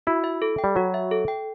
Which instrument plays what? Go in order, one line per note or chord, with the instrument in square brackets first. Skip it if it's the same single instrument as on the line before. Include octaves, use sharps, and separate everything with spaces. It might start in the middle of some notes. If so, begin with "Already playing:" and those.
[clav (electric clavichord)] E4 [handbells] F#4
[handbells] E5
A4
G5
[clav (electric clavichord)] G3
[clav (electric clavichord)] F#3 [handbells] F#4
[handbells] E5
A4
G5